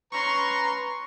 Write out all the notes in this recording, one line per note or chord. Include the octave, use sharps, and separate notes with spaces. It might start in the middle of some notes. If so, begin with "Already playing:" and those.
C#4 B4 A#5 C6 C#6